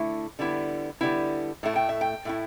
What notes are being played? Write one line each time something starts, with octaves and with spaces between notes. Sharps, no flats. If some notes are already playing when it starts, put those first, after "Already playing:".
Already playing: D3 A3 E4
D3 G3 B3 E4
D3 G3 B3 E4
A2 A3 E4
G5
E5
G5
A2 A3 E4